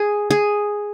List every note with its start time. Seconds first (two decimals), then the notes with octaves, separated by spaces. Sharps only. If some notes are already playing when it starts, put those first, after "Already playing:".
Already playing: G#4
0.31 G#4